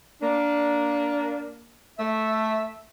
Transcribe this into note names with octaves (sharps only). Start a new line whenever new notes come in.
A#3 D4
A3 E5